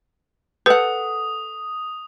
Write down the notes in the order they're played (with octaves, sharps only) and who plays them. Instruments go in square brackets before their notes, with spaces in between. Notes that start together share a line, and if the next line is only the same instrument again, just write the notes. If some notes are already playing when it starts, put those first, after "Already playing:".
[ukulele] A4 F#5 [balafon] B4 [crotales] D#6